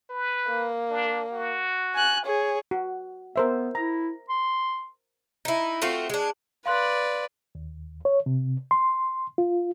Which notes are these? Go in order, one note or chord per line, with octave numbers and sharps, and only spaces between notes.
B4
A#3
D4
F#4
G#5 F#6
G#4 C#5
F#4
B3 A#4 C5 E5
E4 A#5
C6
D#4 E4
A3 C4 F4 F#4
G#3 D4
B4 D5 F5 C6 F#6
D#2
C#5
C3
C6
F4